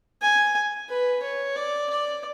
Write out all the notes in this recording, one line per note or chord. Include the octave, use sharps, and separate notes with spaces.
G#5
B4
C#5
D5
D5